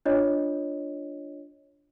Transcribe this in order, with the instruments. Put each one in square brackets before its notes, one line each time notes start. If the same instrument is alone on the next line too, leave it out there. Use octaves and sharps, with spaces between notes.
[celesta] D4 F4 C#5 D#5